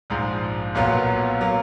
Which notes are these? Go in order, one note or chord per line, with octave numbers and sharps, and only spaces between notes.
A#1 G#2 F3
B1 A#2 F#3 B3 F4
F#3 A#3